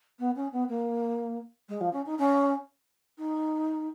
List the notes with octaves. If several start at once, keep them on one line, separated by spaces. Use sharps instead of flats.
B3
C#4
B3
A#3
G#3
F3
C#4
D#4
C#4
D#4